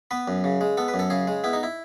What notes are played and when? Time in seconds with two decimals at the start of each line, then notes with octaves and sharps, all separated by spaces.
0.11 B3 B4
0.28 F#2
0.44 C#3
0.61 G#3
0.77 B3 A4
0.88 B4
0.94 F#2
0.99 A4
1.10 C#3 G#4
1.27 G#3
1.44 B3 E4
1.53 D#4
1.63 E4